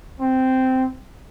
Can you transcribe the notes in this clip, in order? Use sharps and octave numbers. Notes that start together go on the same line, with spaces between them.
C4